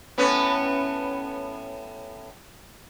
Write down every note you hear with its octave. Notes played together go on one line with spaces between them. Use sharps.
A2 B3 C#4